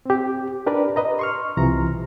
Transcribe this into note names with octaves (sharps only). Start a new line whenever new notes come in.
C4 G4
D4 G4 A#4 B4 D5
B4 D#5 A#5
C6 C#6 F6
C2 C3 E3 F3 A#5